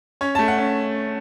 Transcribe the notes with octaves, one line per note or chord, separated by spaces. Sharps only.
C#4 C#5
A3 A5
F#5
C#4